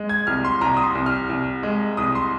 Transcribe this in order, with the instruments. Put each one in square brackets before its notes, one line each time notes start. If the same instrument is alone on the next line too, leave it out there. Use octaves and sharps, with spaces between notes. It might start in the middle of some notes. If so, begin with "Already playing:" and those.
Already playing: [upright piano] G#3
G#6
C2 F6
C6
C2 A#5
D#6
C6
C2
F6
C2
G#3
C2 D#6
C6